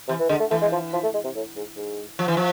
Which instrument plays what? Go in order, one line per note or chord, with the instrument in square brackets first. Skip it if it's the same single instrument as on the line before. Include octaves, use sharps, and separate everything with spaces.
[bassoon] C3 [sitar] E3
[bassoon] E3
[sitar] D3 [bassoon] G#3
[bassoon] A3
[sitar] E3 [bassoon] A3
[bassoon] G#3
F3
F3
A3
G#3
C3
A2
G#2
G#2
[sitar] F3
E3
F3